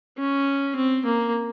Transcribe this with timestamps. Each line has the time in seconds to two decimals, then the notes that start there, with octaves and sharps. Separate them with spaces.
0.19 C#4
0.76 C4
1.06 A#3